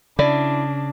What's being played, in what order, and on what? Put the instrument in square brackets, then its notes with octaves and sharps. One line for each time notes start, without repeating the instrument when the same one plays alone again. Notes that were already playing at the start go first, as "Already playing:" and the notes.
[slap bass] C#3 [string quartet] D4 [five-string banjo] E4 D5